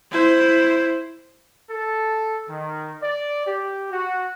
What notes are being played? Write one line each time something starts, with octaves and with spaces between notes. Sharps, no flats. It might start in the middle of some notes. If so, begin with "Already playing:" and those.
E4 C5
A4
D#3
D5
G4
F#4